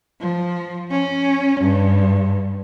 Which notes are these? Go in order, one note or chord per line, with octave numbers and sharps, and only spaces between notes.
F3
C#4
G2